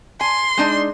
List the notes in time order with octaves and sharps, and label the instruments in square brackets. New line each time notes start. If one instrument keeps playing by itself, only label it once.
[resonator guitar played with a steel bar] G#5 [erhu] C6
[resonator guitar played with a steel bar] G#3 D4 D#4